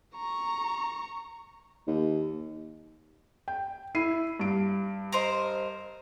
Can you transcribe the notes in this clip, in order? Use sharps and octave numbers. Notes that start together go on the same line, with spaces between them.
A#5 C#6
D#2
G5
E4 C7 D#7
G2 D7
A#4 C5 D#5